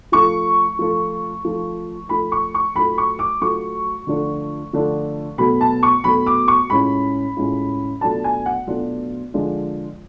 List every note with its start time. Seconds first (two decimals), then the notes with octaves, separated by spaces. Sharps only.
0.12 F3 A3 F4 C#6
0.79 F3 A3 F4
1.45 F3 A3 F4
2.09 F3 A3 F4 B5
2.32 C#6
2.54 C#6
2.75 F#3 A3 F4 B5
2.98 C#6
3.19 D6
3.41 F#3 A3 F4 C#6
4.07 D3 F3 A3 D4 F4
4.73 D3 F3 A3 D4 F4
5.38 B2 F#3 A3 B5
5.61 A5
5.83 C#6
6.04 B2 F#3 A3 B5
6.26 D6
6.48 C#6
6.70 A2 G#3 C#4 F4 B5
7.37 A2 G#3 C#4 F4
8.01 B2 F#3 A3 D4 F4 A5
8.24 G#5
8.46 F#5
8.67 B2 F#3 A3 D4 F4
9.34 D3 F3 G#3 D4 F4